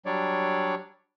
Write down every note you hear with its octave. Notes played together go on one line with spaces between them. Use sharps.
F#3 G3 D4 C#5 D5